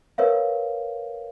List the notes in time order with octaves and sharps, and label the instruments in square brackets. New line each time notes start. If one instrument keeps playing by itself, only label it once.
[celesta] A#4 B4 C#5 E5 F5